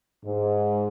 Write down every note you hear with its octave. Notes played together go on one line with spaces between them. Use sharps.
G#2